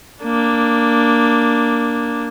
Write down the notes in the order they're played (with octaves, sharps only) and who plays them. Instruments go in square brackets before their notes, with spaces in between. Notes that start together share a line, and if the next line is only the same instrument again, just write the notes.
[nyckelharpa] A#3 D4